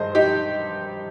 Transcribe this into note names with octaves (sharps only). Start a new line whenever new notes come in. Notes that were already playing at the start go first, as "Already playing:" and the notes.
Already playing: G2 D#3 G#3 C5 D#5
D#4 G4